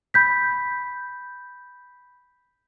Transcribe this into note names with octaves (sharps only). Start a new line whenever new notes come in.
B5 G6 B6